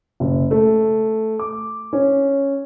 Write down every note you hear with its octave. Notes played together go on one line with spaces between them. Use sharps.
F#1
A3
D6
C#4